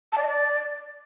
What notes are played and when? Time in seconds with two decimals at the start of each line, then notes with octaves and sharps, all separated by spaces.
0.12 A5
0.17 D5
0.22 D#5
0.27 D5